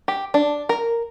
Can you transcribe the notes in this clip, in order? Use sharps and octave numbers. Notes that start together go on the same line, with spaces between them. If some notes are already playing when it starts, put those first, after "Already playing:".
G4
D4
A#4